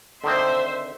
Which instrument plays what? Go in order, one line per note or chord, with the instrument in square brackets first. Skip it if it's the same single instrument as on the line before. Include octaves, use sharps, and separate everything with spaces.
[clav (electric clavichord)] D3 D#3 C4 [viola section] C5 E5 C6